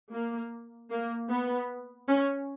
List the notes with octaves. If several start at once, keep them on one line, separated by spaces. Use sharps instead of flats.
A#3
A#3
B3
C#4